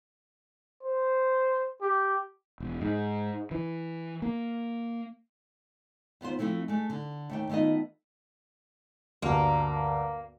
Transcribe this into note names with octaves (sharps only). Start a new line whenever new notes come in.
C5
G4
E1
G#2
E3
A#3
D#2 B3 F4 C5
F3 G#3 A3 C4 E4
G#3 A3
D3
D#2 A3 G5
D#3 A3 B3 F4 D#5
D2 G2 A#3